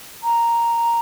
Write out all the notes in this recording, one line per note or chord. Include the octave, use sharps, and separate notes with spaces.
A#5